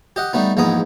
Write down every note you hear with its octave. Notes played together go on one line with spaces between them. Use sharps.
G4 D#5 F#5
G3 A3 B3 D#4
A#1 E2 G#2 B3 A#5 D#6